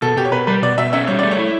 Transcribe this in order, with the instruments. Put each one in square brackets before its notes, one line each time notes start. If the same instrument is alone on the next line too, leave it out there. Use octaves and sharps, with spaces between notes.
[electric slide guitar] B2 [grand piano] A4
[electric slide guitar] B2 [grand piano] G4
[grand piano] C#5
[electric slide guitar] B2 [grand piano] B4
[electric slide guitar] G3 [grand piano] B4
[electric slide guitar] B2 [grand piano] D5
[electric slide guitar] B2 [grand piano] E5
[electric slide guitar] C#4 [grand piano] E5
[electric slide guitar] G3 [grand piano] C#5
[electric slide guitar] A3 [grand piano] D5
[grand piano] C#5
[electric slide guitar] E4